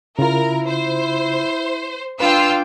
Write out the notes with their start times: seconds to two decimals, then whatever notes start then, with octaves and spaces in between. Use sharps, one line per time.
0.19 C#3 E4 F4 A#4
0.68 C5
2.20 D4 F4 B4 G5 E6